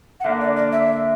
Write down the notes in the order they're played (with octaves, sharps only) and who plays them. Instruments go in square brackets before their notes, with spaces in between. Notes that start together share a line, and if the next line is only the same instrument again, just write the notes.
[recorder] F#5
[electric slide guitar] D3 A#3 D4 [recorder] E5
[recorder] D5
D5
E5